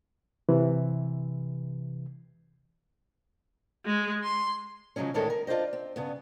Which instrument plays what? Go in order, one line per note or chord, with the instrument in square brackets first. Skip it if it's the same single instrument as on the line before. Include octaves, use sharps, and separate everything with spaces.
[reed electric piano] C3 E3
[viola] G#3
C6
[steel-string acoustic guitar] C#3 F3 F#3 G#3 C#4
D2 A2 D#3 G#3 A4 C#5
A#4
D4 F4 G4 C5 D#5
C4
G2 C#3 B3